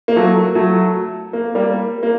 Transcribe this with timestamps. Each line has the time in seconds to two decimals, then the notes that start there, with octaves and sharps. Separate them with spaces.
0.08 A#3
0.16 F#3 A3
0.55 F#3 A3
1.33 A#3
1.55 G3 A#3
2.03 A#3